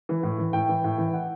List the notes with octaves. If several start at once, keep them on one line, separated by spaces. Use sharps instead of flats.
E3
A2
E3
A2 G5
E3
A2
E3
E5
F#5